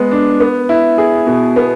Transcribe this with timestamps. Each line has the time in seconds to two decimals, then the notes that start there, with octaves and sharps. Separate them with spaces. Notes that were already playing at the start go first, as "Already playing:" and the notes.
Already playing: G#3 B3
0.11 D4
0.40 B3
0.69 E4
0.98 G#4
1.27 B2
1.56 B3